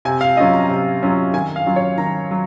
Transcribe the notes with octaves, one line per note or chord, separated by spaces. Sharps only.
C3 G#5
F5
F#3 C#4 F4 D#5
A#5
C3
F#3 C#4 F4
D#3 G#5
F5
F#3 C#4 F4
C#5
D#3 A#5
F#3